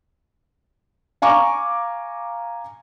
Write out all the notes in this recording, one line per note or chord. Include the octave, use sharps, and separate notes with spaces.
F5 G#5 A#5 C#6 D6